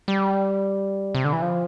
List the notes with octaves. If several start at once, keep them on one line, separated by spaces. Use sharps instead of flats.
G3
C3
D3
E3
F3